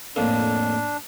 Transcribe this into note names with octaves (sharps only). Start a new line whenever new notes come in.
F2 A2 A#3 D4